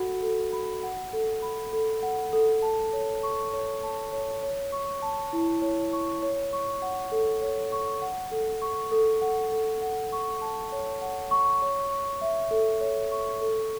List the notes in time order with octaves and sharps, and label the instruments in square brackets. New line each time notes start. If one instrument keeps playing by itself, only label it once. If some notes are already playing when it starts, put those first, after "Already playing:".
Already playing: [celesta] F#4 A4 F#5 B5
A4
B5
F#5
A4
B5
A4
F#5
A4
A5
C#5
C#6
C#5
A5
C#5
C#5
C#6
A5
E4
C#5
C#6
C#5
C#6
F#5
A4
C#5
C#6
F#5
A4
C#6
A4
F#5
A4
F#5
C#6
A5
C#5
F#5
C#6
C#5
C#6
E5
A4
C#5
C#6
A4